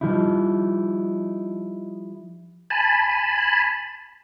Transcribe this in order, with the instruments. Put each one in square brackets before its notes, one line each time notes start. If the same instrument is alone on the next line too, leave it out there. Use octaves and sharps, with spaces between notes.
[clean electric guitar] F3 G3 D#4 E4
[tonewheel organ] G#5 A5 B5